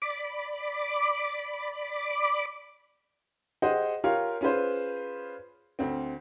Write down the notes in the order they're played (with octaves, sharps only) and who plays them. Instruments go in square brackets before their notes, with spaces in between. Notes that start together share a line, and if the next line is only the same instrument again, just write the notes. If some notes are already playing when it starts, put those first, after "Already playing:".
[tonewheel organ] D5 B5 D6
[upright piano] G4 G#4 C5 D#5 F#5
F4 G4 A#4 C#5 F5
C#4 F4 G#4 B4 C5
D2 C4